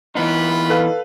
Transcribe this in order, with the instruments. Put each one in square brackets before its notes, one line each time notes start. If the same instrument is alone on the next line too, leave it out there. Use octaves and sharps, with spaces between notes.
[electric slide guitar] E3 B3 D#4 [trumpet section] F4 B5
[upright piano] A4 B4 F5